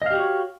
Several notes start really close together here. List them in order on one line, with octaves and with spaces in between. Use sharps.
D#5 F5 G4 F#4 C#5